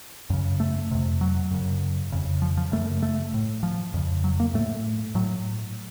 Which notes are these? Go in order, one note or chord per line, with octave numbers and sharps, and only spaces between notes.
F#2 C#3
A3
F2 C3
F#3
F#2 C#3
F2 C#3
F3
F3
F#2 C#3 A3
A3
A2
F3
F2 C#3
F#3
A#3
A2 A3
A2 F#3